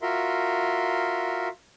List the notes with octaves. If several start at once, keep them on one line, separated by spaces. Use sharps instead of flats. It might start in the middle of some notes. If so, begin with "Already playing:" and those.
F4 F#4 A#4 E5 C6